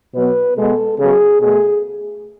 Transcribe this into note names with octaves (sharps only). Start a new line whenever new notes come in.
B2 F#3 B3 B4
B2 G#3 B3 A4
C#3 F#3 B3 G#4
B2 A3 G#4